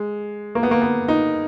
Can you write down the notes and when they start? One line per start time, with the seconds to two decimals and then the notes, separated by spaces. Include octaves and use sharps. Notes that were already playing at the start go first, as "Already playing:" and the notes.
Already playing: G#3
0.55 A#3
0.63 B3
0.71 A#3
0.82 B3
1.08 D#4